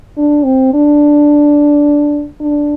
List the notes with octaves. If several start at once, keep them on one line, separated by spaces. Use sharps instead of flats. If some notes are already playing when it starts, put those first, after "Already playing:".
D4
C4
D4
D4